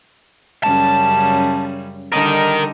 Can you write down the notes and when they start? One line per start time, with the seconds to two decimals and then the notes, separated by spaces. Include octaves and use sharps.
0.63 F#2 C#3 G3 A5
2.12 D3 G3 D#4 A#4 D#5